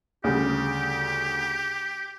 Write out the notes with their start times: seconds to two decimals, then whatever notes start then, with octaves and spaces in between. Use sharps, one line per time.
0.24 D2 C#3 G3 G4